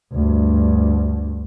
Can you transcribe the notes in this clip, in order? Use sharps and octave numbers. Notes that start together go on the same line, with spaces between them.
D2 G2